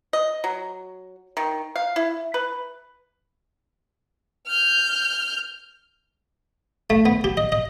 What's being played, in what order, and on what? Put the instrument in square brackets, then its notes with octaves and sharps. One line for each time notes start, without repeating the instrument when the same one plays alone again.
[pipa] D#5
F#3
D#3
F5
E4
B4
[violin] F6 G6
[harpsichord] A3
B3
G4
D#5
D#5